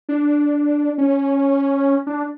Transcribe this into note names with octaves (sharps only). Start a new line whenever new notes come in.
D4
C#4
D4